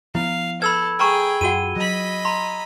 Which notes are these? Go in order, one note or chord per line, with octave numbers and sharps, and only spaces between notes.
F3 B3 E4 F5
A4 B4 B5 E6 G#6
G#4 B4 G5 A#5 C#6
F#2 F4 F#4 F#5 D#7 G7
F#3 D#5 B5
A#5 C6